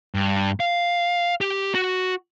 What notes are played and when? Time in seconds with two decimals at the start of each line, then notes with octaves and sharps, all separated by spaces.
0.15 G2
0.60 F5
1.41 G4
1.75 F#4